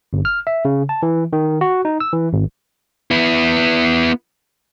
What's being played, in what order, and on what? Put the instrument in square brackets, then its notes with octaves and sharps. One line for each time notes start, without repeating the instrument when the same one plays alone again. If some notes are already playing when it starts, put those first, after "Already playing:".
[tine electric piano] G1
F6
E5
C#3
A5
E3
D#3
F#4
D#4
E6
E3
G#1
[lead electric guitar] B3 E4